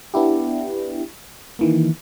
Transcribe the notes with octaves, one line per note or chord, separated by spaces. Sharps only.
B3 D4 E4 G4
D#3 E3 A#3